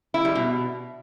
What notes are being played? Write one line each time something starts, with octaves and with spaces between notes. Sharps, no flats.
E4
G3
B2